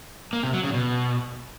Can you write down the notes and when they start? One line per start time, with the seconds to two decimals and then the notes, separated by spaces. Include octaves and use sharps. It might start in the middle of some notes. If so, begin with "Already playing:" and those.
0.33 A#3
0.43 C3
0.53 F#3
0.63 C#3
0.74 B2